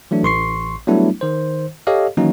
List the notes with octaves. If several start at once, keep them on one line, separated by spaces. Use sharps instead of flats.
E3 F#3 A3 D4
A1 C6 C#6 C7
F#3 G3 A3 B3 D4 E4
D#3 C5
G4 A4 C#5 D#5 F5
D#3 E3 F#3 A#3 C#4 D#4